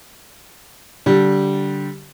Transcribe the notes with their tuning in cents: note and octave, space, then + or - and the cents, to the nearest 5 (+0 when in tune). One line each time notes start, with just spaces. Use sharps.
D3 -15 G3 -15